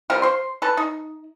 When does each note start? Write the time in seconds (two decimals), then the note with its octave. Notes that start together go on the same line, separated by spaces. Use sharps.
0.10 G3 C4 F4 A#4
0.22 C5 C6
0.62 A4 B4 A5
0.77 D#4